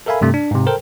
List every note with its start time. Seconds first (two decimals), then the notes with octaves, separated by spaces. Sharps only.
0.06 A4 A#4 E5 F5 G#5 B5
0.21 G2 C3 A3
0.34 D4
0.51 G#2 C3
0.66 A4 A#4 C5 G5